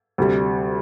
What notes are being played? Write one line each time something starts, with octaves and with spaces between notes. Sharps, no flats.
D2 C3 G3